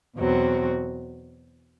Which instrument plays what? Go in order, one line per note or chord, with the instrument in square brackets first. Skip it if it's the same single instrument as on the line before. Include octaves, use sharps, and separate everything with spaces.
[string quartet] E2 B2 F#3 C4 F#4